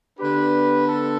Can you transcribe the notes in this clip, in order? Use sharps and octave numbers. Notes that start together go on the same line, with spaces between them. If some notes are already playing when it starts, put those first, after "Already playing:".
D3 B3 D4 G4 B4
A4